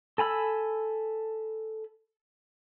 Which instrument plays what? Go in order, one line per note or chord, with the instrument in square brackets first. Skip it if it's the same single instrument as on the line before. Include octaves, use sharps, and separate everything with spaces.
[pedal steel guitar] A4 G#5 B5 E6